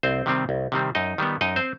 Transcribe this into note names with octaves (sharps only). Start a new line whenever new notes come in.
C2 C4 C5
C3 D#3 G3 C4
C2
C3 D#3 G3 C4
F#2 D#4 D#5
D#3 G3 B3
F#2 D#4 D#5
C4 C5